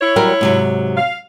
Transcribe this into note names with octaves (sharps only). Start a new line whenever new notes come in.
E4 C#5
F#3 G3 A#4
G#2 C3 F#3
F5